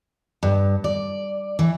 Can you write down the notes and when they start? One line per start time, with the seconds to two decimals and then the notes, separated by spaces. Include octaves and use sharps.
0.43 G2
0.84 D5
1.59 E3